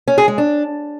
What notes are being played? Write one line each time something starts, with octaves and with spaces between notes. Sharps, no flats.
C#4
G#4
G#3
D4